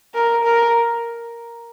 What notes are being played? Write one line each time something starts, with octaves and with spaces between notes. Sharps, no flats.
A#4
A#4